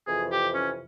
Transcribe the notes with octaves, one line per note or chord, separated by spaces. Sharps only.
F2 C3 E3 G#4
G4
C#4